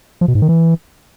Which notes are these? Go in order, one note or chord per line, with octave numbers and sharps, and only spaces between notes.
F3
B2
G#2
D#3
E3